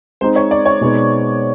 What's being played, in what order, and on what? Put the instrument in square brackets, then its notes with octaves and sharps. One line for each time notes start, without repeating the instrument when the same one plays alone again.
[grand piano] G#3 C4 D#4 [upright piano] C5
[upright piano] C#5
D5
C#5
[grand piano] B2 G#3 B3 D#4